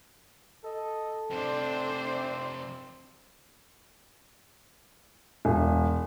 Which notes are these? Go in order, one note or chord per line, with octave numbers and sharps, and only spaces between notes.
A4 D#5
F2 C3 C4 D4 C5
E1